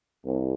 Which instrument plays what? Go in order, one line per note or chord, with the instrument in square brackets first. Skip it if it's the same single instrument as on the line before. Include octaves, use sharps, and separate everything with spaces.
[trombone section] C2